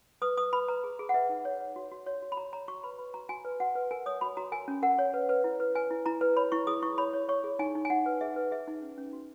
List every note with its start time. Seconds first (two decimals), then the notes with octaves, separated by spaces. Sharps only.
0.22 B4 D#6
0.37 B4 D#6
0.53 B4 B5
0.68 B4 A#5
0.84 G#4
0.99 G#4
1.09 F#5
1.14 B4 E5
1.29 D#4
1.45 C#5
1.61 C#5
1.76 F#4
1.92 F#4
2.06 F#4 C#5
2.22 F#4
2.32 B5
2.37 F#4 A#5
2.53 C#5 A#5
2.68 F#4 C#6
2.84 B4 B5
2.99 B4 B5
3.14 F#4 A#5
3.29 F#4 G#5
3.45 B4
3.60 F#4 F#5
3.75 B4
3.91 A#4 G#5
4.06 C#5 D#6
4.21 F#4 B5
4.37 F#4 A#5
4.52 A#4 G#5
4.68 C#4
4.83 A#4 F#5
4.99 C#5
5.14 B4
5.29 B4
5.44 E4
5.60 B4
5.75 B4 G#5
5.91 E4
6.06 E4 A#5
6.21 B4
6.36 C#5 B5
6.52 E4 C#6
6.67 G#4 D#6
6.82 E4 C#6
6.98 C#5 B5
7.13 C#5
7.29 C#5 C#6
7.44 G#4
7.59 D#4 G#5
7.75 D#4
7.85 G#5
7.90 D#4 F#5
8.06 B4
8.21 G#4 E5
8.36 B4
8.51 G#4 E5
8.67 D#4
8.82 C#4
8.98 C#4
9.13 F#4